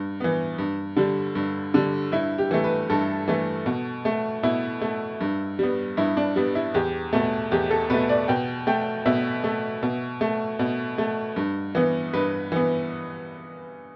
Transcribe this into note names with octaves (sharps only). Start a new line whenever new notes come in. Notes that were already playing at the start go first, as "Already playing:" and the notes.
Already playing: G2
E3 B3
G2
D3 G3
G2
D3 G3
G2 E4
G4
E3 A3
B4
G2 A4
E3 A3
B2
A3
B2 E4
A3
G2
G3 B3
G2 E4
D4
G3 B3
E4
E2 G4
B2 A3
E2 G4
A4
B2 A3 B4
D5
B2 G5
A3 G5
B2 E5
A3
B2
A3
B2
A3
G2
E3 B3
G2 B4
E3 B3